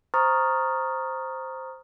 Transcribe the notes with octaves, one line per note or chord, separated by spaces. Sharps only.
C5 A#5 C#6 D#6 F6 A6